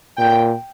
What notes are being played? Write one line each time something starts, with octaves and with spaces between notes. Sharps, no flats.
A#2 G5